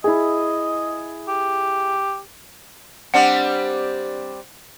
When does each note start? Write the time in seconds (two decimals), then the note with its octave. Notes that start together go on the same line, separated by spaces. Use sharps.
0.04 E4 G#4 D#5
1.28 G4
3.14 G3 C4 D4 F#5